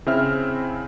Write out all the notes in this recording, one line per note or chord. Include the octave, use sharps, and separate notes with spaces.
C#3 C4 E4 E5 F6